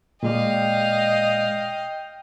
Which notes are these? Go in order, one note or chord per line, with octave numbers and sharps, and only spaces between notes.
A#2 G#3 D5 D#5 F5 G5